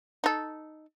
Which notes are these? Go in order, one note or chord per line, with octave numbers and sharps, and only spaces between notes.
D#4 A4